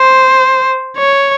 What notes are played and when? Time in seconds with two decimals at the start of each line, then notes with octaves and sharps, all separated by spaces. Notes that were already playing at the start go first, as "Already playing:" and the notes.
Already playing: C5
0.97 C#5